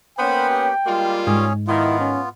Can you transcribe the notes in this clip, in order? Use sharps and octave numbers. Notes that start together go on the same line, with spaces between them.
A#3 B3 C#4 C5 G5 B5
G4
G3 G#3 A#3 F4
G#2 C#4 G#4 C#5
D#3 B3 E4 F4
C#4